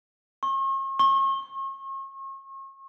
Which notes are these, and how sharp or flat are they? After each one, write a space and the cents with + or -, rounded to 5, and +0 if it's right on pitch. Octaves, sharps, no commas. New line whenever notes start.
C#6 -45
C#6 -40